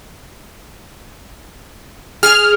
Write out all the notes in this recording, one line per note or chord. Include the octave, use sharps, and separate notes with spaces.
G#4 F6